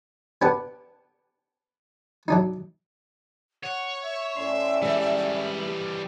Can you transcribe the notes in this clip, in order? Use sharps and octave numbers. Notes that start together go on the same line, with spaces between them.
B3 D4 G4 B4 F#5
F#3 D4 D#4
C#5 F#5
E5
A2 C#4 D5 C6
E3 G3 G#3